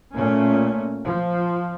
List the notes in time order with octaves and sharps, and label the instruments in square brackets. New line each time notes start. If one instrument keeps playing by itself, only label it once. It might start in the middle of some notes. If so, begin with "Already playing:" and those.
[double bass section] A#2 A3 C#4
F3